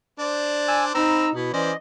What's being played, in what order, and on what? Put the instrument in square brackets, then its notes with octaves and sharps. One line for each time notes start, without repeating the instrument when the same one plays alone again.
[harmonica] D4 C5 [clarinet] D5
[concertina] G#5 E6
[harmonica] C4 B5 [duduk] D#4 [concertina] A#5 [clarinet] E6
[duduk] B2 [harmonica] B3 [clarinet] E4
[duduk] E3 [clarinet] C#4 [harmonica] C5 D5 [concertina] D#5